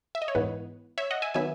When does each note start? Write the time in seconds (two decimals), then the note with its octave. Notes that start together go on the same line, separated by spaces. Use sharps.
0.15 E5
0.22 D#5
0.28 C#5
0.35 G#2 E3 B3 B4
0.98 C#5 E5
1.11 D#5 F#5
1.22 E5 G#5
1.34 D#3 F#3 B3 E5 G#5